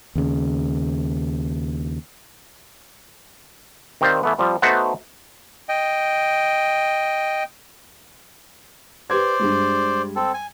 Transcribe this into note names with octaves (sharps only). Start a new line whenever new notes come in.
D#2 C#3
D#3 C4 G4 C5 D5 F5
E3 A3 B3
F3 G3 C4
A3 B3 D#4 F#4 C5 F#5
D#5 G5
G4 B4 C5 D5 G#6
G2 G3 G#3
C4 A4
G#5